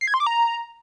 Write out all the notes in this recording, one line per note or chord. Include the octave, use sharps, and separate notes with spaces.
C7
G#6
C6
D6
A#5